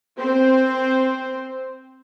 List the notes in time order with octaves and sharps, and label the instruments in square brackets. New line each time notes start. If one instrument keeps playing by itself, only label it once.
[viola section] C4 C5